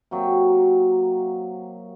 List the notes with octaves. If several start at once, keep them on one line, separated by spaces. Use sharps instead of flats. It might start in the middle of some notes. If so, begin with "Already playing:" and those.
C3 F#3 A#3